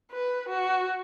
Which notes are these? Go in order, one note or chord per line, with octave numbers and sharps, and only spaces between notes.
B4
F#4